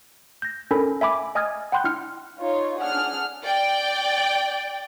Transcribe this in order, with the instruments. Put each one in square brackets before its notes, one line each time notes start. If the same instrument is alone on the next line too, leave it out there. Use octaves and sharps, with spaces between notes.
[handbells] G6 A#6
C#4 D4 A4 A#4 G#5 B5
E5 G#5 B5 D6
D#5 G#5 D#6 F6 G#6 A6
F#5 G5 B5 C6 F#6 G6
D4 E4 F6 C#7
[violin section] D#4 F4 C#5
D4 G#4 F#5 F6
D5 G5